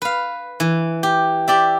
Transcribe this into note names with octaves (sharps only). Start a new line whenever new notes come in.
B4 F5
E3
G4
G4 D5 E5